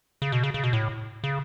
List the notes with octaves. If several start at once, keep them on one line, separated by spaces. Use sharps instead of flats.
C#3
B2
C#3
C#3
B2
A2
C#3